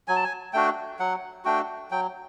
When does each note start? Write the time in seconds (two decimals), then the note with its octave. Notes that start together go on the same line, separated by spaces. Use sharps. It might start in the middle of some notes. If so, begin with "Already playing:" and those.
0.08 F#3 G#5
0.16 A5
0.24 G#5
0.53 A3 D4 F#4 G5
1.00 F#3 F#5
1.45 A3 D4 F#4 G5
1.91 F#3 G5